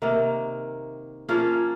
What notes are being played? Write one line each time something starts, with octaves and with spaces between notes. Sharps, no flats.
C3 D#3 A#3
F3 A#3 C#4 G#4